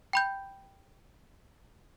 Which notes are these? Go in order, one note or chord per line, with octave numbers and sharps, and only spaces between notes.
G5 B5 G6